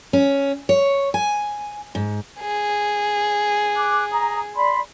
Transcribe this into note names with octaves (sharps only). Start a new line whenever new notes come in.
C#4
C#5
G#5
G#2
G#4
D6 F#6
A#5 D#6
D5 B5 C6